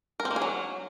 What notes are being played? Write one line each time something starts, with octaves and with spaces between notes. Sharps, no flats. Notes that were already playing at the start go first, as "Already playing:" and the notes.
A#4
C4
A#3
G#4
F#3